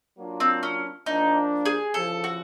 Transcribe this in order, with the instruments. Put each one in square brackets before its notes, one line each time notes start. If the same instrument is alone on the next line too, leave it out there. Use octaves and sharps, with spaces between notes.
[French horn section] F#3 A#3 D4 F4
[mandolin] C4
C#4
[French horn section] F3 A#3 D4 [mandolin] D#4
[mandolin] G#4
[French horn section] E2 C#3 F3 [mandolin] A4
[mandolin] F#4